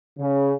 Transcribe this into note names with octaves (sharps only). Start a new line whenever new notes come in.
C#3